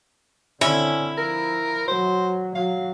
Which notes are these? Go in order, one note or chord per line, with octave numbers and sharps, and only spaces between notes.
D3 C4 C#4 E4
F3 A#4
F#3 C5
F#3 F5